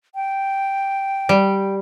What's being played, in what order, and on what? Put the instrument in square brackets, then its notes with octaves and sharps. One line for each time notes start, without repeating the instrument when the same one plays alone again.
[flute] G5
[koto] G3